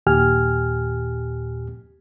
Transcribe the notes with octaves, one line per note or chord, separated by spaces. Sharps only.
D#2 A#2 G4 G#5 F6